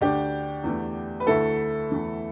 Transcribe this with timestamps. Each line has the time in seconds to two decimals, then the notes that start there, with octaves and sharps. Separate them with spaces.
0.01 D2 D3 A3 D4 G4
0.64 E2 E3 A3
1.20 B4
1.27 D2 D3 A3 E4 A4
1.90 E2 E3 A3